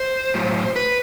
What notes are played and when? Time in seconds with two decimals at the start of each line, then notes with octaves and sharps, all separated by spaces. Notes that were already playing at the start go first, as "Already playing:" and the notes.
Already playing: C5
0.34 A2 F#3
0.76 B4